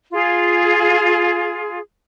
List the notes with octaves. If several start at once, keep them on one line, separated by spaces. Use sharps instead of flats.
F4 G#4